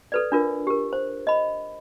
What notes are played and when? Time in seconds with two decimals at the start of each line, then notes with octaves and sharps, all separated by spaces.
0.12 A4 B4 D5
0.32 D4 F4 A#4
0.67 G4 A#4
0.93 C5
1.27 D#5 B5